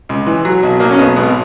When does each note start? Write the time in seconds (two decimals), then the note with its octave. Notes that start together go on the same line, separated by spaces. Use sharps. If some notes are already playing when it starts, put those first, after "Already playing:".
0.09 C#2
0.27 E3
0.45 F#3
0.63 B1
0.80 F#3 A#3
0.91 C#4
0.98 B1 B3
1.16 G#1 B3